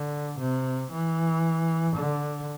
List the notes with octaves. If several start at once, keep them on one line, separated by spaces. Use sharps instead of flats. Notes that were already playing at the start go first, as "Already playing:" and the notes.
Already playing: D3
C3
E3
D3